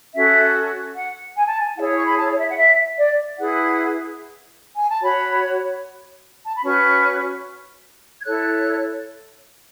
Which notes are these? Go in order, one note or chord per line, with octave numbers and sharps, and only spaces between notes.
C#4 F#4 A4 E5
F#5
G#5
A5
G#5
E4 G#4 C#5 F#5
C#6
B5
A5
E5
F#5
E5
D5
E4 G#4 B4 F#5
G#5
A5
F#4 C#5 B5
A5
B5
C#4 F#4 B4 C#6
G#6
E4 A4 C#5 F#6